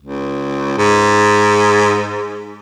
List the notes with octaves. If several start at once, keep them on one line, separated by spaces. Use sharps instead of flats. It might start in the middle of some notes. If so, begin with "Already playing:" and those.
C#2
G#2